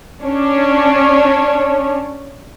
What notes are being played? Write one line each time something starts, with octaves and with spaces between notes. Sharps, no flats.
C#4 D4 C#5